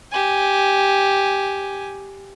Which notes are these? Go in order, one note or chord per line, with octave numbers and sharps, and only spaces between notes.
G4 G#5